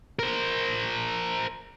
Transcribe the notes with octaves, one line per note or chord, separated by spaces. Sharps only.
A#4 C5